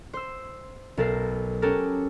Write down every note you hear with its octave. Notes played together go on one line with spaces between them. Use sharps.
C5 E6
B1 A4 A#4 C7
C#4 F#4 G4 A4 A#4